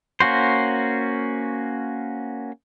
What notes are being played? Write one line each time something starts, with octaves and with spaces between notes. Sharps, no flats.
A#3 C#4 F#4 C5